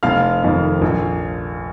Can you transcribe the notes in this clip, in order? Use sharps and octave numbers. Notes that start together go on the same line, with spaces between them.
F1 F5 F6
F2 D#3
A#1